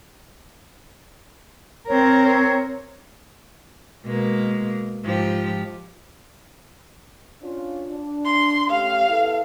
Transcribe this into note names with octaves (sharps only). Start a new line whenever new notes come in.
C4 A#4 C#5
C#5
B2 G#3 A#3
G#2 F3 G4
C#4 D4 F4
D4
C6
A3 C#4 G4 F5
B3 E4 A4